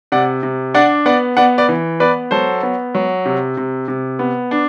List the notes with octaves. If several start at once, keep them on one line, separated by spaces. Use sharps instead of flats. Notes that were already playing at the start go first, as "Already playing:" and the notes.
C3 D5 F#5
C3
D4 D5 F#5
B3 D5 F#5
B3 D5 F#5
B4 D5
E3
B3 B4 D5
F#3 A4 C5
B3
F#3
C3
C3
C3
B3
D4